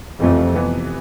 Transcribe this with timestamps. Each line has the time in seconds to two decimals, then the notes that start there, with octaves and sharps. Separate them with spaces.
0.19 F2 C3 E3 A3
0.54 C3 E3 B3